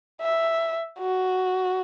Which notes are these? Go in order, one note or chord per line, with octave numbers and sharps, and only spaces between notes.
E5
F#4